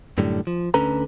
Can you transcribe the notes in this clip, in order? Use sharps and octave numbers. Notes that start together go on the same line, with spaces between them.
F#2 A2 D3 G3
F3
D2 D3 C#4 A4 B4 A#5